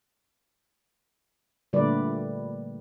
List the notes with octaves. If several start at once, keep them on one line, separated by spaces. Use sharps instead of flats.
A#2 D3 G3 A3 B4 D5